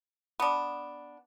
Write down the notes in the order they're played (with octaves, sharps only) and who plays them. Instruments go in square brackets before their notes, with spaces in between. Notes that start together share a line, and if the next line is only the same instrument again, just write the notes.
[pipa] B3 D4